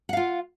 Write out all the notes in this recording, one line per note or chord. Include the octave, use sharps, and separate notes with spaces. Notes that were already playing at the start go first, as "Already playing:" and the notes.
F4 F5 F#5